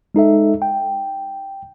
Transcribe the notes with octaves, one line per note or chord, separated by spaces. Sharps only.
G#3 D#4 A4 E5
G5